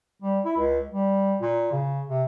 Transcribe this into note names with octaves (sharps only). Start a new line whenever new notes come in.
G3
E4
C#2
G3
A#2
C#3
C3